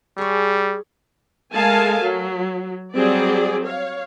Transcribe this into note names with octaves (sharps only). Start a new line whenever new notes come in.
G3 G#4 C#5
G#3 A3 A#4 F5 G#5 A5
F#3
F#3 G3 C4 G#4 D5
C#5 F5